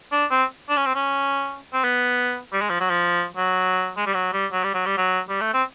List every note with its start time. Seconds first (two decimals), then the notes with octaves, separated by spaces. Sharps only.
0.12 D4
0.31 C4
0.69 D4
0.77 C#4
0.86 C4
0.95 C#4
1.74 C4
1.84 B3
2.53 G3
2.61 G#3
2.70 F3
2.81 F#3
2.90 F3
3.37 F#3
3.97 G#3
4.06 G3
4.14 F#3
4.33 G3
4.52 F#3
4.64 G3
4.74 F#3
4.86 G3
4.98 F#3
5.29 G3
5.41 A3
5.54 C4